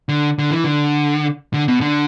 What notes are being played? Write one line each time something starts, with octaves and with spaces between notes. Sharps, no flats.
D3
D3
E3
D3
D3
B2
D3